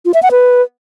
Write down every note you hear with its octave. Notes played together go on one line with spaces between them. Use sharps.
F4
E5
F#5
B4